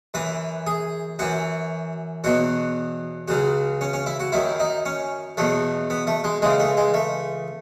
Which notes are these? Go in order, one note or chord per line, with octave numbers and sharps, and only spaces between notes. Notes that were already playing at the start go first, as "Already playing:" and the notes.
F#2 E3 B4
G#4
F#2 E3 F#4
E2 B2 F#3 F#4
C#2 C#3 F#3 F#4
C#4
C#4
E4
F#4
F#2 D#3 F#3 E4
D#4
C#4
E2 B2 F#3 A3
B3
A3
G#3
C#2 C#3 E3 G#3
A3
G#3
A3